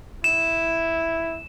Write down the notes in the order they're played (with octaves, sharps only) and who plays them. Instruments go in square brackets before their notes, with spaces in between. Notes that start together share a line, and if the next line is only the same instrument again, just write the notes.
[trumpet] E4 [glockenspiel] E7